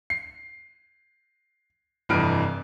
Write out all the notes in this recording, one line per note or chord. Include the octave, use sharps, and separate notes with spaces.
C7
F1 G2 E3 D#5 F6 D7